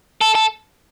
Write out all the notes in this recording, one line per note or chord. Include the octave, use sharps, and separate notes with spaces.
A4
A4